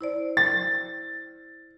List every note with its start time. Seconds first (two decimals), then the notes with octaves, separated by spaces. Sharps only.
0.01 E4 C5 D5
0.37 A6